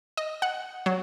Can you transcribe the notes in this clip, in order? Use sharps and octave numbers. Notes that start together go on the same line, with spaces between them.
D#5
F#5
F#3